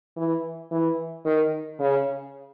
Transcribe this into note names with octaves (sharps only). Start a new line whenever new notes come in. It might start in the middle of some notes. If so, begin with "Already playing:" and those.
E3
E3
D#3
C#3